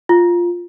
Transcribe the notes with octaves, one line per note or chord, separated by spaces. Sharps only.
F4